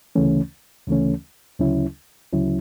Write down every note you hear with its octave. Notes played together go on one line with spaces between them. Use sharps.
D2 C#3 E3 A3 C#4
D2 C#3 E3 A3 C#4
D2 C#3 F#3 C#4 E4
D2 C#3 F#3 C#4 E4